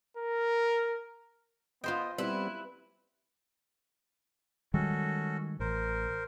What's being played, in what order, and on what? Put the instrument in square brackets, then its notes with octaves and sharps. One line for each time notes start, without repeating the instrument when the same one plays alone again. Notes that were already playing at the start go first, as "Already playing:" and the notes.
[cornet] A#4
[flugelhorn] B3 [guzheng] F4 C5 G5 [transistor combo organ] D#5
[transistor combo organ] G3 B3 C4 [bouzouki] E4 [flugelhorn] B4
[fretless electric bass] D#3 G3 G#3 [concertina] C#4 F#4 A4
[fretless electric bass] A1 [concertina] A#4 C5